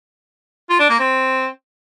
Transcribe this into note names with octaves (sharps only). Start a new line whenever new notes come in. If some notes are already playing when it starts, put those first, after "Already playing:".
F4
D4
A#3
C4